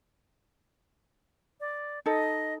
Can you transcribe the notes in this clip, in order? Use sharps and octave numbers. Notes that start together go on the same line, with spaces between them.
D5
D#4 A4 D#5